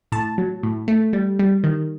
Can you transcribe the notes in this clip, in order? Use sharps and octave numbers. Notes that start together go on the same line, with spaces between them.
A2 A5
F#3
A2
A3
G3
G3
D#3